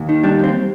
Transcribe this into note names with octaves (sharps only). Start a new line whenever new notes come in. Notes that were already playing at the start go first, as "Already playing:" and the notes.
Already playing: D#2
D#3
G3 D4
D#2 C4